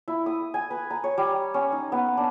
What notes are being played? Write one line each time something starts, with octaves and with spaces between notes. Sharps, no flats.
E4
D#6
G#5
B4
A#5
C#5
G3
C#4
D#4
B3
D4